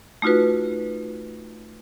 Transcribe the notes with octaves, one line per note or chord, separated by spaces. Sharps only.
A3 D#4 F4 F#4 B4